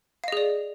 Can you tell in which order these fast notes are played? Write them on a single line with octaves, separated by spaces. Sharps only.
F5 D#5 G#4 D5